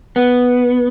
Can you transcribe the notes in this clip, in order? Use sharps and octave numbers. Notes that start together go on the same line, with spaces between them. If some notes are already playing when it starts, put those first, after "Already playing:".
B3